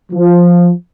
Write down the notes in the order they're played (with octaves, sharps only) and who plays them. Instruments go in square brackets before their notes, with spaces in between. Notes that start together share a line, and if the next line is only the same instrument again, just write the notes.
[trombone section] F3